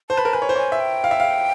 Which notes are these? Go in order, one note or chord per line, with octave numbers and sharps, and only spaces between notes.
C5 A5
B4
A#4
B4 G#5
C#5
C5
C#5 G#5
E5
G5
F5
E5
F5